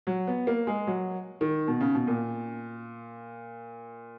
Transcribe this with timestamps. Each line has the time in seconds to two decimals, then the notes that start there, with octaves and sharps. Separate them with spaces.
0.07 F#3
0.27 B3
0.47 A#3
0.67 G#3
0.87 F#3
1.41 D#3
1.68 B2
1.80 C#3
1.95 B2
2.07 A#2